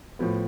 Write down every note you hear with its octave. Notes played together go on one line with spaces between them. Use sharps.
A2 F3 B3